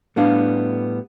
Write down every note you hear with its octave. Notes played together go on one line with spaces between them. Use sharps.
A2 G3 B3 D4 F5